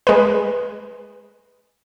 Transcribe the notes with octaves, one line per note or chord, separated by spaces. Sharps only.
G#3 B4